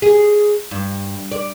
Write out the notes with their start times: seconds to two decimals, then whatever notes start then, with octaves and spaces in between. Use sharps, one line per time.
0.02 G#4
0.71 G2
1.31 D5